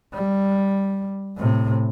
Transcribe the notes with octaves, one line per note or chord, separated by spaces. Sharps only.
G3
A2 C3